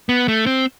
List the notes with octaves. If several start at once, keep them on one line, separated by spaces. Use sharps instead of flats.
B3
A3
C4